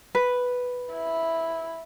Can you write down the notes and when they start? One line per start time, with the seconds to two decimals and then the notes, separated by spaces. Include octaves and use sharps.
0.15 B4
0.93 E4